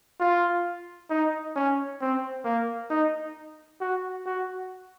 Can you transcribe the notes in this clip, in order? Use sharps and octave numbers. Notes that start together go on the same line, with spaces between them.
F4
D#4
C#4
C4
A#3
D#4
F#4
F#4